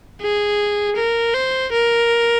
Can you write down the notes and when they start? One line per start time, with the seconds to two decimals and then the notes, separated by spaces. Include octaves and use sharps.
0.21 G#4
0.97 A#4
1.34 C5
1.73 A#4